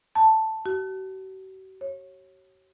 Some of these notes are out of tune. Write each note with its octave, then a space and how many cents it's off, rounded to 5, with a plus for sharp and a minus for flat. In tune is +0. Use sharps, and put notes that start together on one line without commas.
A5 +5
F#4 +45
C#5 -20